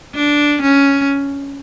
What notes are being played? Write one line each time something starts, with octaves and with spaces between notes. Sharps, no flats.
D4
C#4